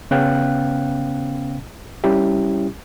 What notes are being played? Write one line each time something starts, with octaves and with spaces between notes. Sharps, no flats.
C#3 B3 C#4 F5 G5 F#6
G3 C#4 E4 G4